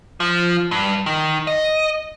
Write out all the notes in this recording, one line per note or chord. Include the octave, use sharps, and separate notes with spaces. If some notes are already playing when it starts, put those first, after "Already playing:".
F3
G2
D#3
D#5